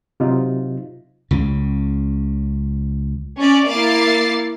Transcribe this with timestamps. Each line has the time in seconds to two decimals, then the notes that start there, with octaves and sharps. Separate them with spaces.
0.20 C3 F#3 D#4 F4
1.31 C#2 C#3
3.39 C#4 D5
3.69 A#3 E4 F5 D6 A6 C7